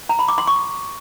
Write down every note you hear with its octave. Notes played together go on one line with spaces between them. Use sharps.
A#5
B5
D6
C6
C#6